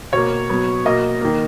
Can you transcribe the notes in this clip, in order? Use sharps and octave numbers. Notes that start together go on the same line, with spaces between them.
B2 A#3 C#5
B2 F#3 B3
B2 A#3 D#5
D#3 A#3